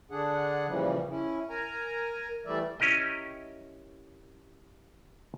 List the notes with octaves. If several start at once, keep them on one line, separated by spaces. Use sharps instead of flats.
D3 D4 G#4 F#5
A#2 C#3 E3 F3 G3
C#4 E4
A#4 G#5 A#5
E3 G3 A3 D5 E5
C#4 E4 G4 A#4 D#5